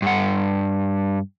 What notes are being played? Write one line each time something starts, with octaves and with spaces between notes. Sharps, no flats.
G2 F#5